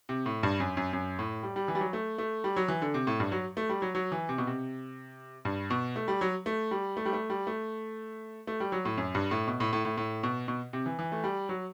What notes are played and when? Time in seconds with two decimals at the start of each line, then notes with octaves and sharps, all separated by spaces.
0.09 C3
0.26 A2
0.43 G2
0.60 F#2
0.77 F#2
0.93 F#2
1.19 A2
1.43 G3
1.56 G3
1.68 E3
1.75 G3
1.81 F#3
1.93 A3
2.18 A3
2.44 G3
2.56 F#3
2.68 E3
2.82 D3
2.94 C3
3.07 A2
3.20 G2
3.32 F#3
3.57 A3
3.69 G3
3.82 F#3
3.95 F#3
4.12 E3
4.29 C3
4.38 B2
4.47 C3
5.45 G2
5.70 B2
5.96 A3
6.08 G3
6.21 F#3
6.46 A3
6.71 G3
6.97 A3
7.05 G3
7.13 A3
7.30 G3
7.47 A3
8.47 A3
8.60 G3
8.72 F#3
8.85 A2
8.97 F#2
9.15 G2
9.31 A2
9.47 B2
9.60 A2
9.73 A2
9.85 A2
9.97 A2
10.23 B2
10.48 B2
10.73 C3
10.86 E3
10.99 E3
11.12 A3
11.24 G3
11.49 F#3